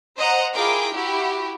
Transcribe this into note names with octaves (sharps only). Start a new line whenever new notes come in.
C5 D#5 F#5 A#5
E4 F4 G#4 A#4 G5 D6
E4 F#4 G4